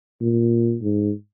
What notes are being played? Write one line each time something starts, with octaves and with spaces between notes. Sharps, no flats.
A#2
G#2